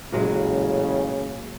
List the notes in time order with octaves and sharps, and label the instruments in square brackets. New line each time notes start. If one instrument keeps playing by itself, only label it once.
[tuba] A1 [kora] A#2 F#3 G#3 [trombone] C#3